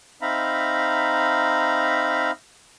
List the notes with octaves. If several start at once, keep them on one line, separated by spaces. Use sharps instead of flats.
C4 D#4 E5 F5 A#5 B5